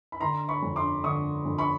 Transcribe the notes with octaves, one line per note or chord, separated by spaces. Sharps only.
B5
D3 A#5 C6
B5 C#6
F2
C6 D6
D3 C#6 D#6
F2
B5 C#6